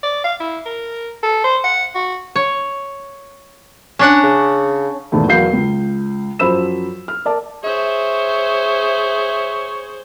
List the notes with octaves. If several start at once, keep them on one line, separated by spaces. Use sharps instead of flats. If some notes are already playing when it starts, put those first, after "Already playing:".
D5
F5
E4
A#4
A4
C5
F#5
F#4
C#5
C#4 D4 F#5
C#3
E2 A#2 D#3 F3 A3
E2 F#3 A#4 F5 G6 C7
C#2
F#2 F3 C5 B5 E6 E7
F6
A#4 D5 A5
G#4 C5 C#5 E5